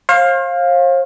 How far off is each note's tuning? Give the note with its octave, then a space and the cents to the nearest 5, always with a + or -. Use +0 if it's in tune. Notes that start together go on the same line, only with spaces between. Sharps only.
C5 +45 F5 +10